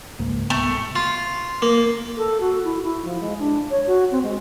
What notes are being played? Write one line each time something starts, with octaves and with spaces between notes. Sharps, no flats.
C#2 G#2 A#3
C2 A3 B3
F4
A#3
A4
F#4
E4
E4
F3
G#3
D4
C#5
F#4
C4
G#3